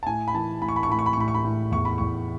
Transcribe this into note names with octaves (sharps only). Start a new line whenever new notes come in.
A5
A2 G#5
B5
E3 A5
A2 B5
C#6
B5
C#6
A2 B5
C#6
B5
C#6
A2 B5
C#6
B5
A2
E2 C#6
B5
E2 C#6